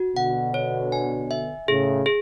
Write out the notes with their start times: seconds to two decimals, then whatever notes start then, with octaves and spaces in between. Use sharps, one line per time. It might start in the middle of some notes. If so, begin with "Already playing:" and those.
Already playing: F#4
0.16 B2 D3 F#5
0.54 C#5
0.92 G#5
1.31 E5
1.68 A2 C#3 G#4
2.06 G#4